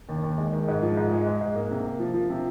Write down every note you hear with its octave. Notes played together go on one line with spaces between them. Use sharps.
D#2
D#2
G#3
D#3
G#2
F3
G#2
G#3
G#3
G#2
A#3
C3
A#3
F3
F3
C3